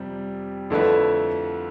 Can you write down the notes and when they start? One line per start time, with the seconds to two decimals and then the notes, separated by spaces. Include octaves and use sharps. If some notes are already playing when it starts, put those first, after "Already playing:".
Already playing: F2 C3 G3
0.70 F2 D3 A3 E4 B4